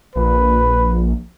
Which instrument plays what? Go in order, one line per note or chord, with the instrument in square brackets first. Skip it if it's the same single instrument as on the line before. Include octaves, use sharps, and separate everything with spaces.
[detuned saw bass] A#1 [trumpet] B4